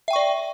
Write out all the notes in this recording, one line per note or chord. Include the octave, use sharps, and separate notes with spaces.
D5 E5 G5 C#6